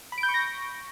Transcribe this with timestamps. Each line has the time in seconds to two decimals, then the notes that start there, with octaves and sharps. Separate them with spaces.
0.12 B5
0.18 D7
0.23 G6
0.29 C#6
0.34 A#6